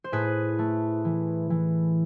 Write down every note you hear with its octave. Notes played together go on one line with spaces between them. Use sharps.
C5
A2 G#4 B4
A3
E3
E3